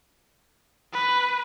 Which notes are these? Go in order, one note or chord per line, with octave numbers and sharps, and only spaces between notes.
B4